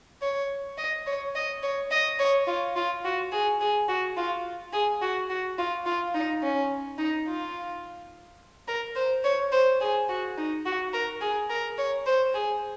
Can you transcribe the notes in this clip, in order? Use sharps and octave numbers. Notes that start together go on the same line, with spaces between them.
C#5
D#5
C#5
D#5
C#5
D#5
C#5
F4
F4
F#4
G#4
G#4
F#4
F4
G#4
F#4
F#4
F4
F4
D#4
C#4
D#4
F4
A#4
C5
C#5
C5
G#4
F#4
D#4
F#4
A#4
G#4
A#4
C#5
C5
G#4